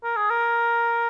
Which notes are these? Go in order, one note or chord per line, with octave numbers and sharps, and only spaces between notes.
A#4
G#4
A#4